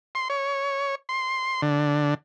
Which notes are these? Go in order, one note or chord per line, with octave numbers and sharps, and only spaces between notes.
C6
C#5
C6
D3